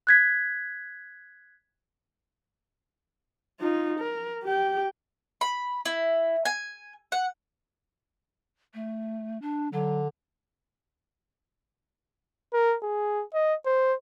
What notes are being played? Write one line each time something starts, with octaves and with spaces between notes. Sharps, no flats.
F#6 G#6 B6
D#4 F4
A#4
G4 G5
B5
E4
G#5
F#5
A3
D4
D3 F#3
A#4
G#4
D#5
C5